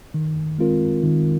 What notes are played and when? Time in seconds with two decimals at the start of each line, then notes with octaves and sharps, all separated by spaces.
0.14 D#3
0.58 G#3 C4 F4 A#4
1.03 D#3